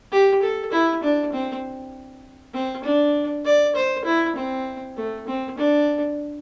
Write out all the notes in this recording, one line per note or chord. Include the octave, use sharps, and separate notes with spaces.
G4
A4
E4
D4
C4
C4
D4
D5
C5
E4
C4
A3
C4
D4